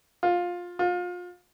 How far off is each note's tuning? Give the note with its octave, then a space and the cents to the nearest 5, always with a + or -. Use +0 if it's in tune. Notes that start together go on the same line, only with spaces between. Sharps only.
F4 +15
F4 +30